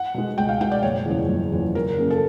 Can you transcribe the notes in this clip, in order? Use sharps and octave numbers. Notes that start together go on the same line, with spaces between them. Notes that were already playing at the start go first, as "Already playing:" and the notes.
Already playing: F#5
B2 G#3
C#2 G5
F5
B2 G#3 G5
D5
F#1 C#5
E2 C#3 F3
F#1
E2 C#3 F3
F#2 A#4
C#3 F#3 A#3 C#4
A4